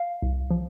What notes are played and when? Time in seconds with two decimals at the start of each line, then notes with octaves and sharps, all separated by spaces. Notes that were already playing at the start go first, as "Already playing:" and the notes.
Already playing: F5
0.22 C2
0.50 F3